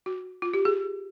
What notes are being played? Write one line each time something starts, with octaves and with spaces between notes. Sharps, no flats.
F#4
F4
G4
G#4